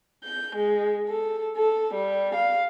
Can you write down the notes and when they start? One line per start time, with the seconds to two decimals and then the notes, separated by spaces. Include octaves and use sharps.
0.24 G6
0.56 G#3
1.08 A4
1.55 A4
1.93 G3
2.34 F5